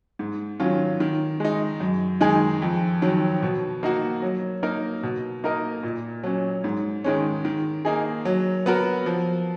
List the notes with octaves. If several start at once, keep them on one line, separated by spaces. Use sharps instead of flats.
G#2
D#3 F#3 C#4 F4
D#3
G#3 D#4
F#2
D#3 G#3 D#4 G#4
F2
D#3 F#3
B2
A#3 D#4 F#4
F#3
A#3 D#4 A#4
B2
A#3 D#4 A#4 D#5
A#2
F#3 C#4
G#2
D#3 G#3 C#4
D#3
A#3 D#4 G#4
F#3
B3 F#4 A#4
F3